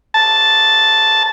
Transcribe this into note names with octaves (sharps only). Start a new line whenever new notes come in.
A5